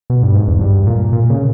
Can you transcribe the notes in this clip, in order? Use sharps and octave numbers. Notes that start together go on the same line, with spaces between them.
B2
G2
G#2
E2
G2
A#2
A#2
C#3